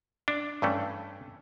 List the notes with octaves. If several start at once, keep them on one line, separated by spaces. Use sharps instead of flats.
D4
G2 E3 A3 C#4